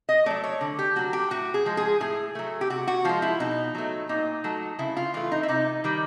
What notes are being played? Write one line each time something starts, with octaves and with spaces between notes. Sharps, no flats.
D#5
F#3 A3 D5
C#5
D3
G4
F#3 A3 F#4
G4
A2 F#4
G#4
F3 G#3
G#4
A2 G#4
F#3 A3
G4
C3 F#4
F#4
F3 G#3 F4
E4
B2 D#4
F#3 A3
A#2 D#4
F#3 A3
C#3 E4
F4
E3 A3 F4
D#4
E4
C3 D#4
D#3 G3